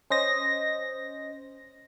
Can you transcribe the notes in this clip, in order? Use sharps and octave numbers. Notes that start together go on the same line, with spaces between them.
C#4 C5 D#5 A#6